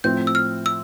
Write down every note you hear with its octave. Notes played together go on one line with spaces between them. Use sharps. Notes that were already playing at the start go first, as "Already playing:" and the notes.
A2 F3 C4 G6
E6
F6
E6